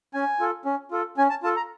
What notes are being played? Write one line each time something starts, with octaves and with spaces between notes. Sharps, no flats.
C#4 G#5
F4 A4
C#4
F4 A4
C#4 G#5
A5
F4 A4 A5
A#5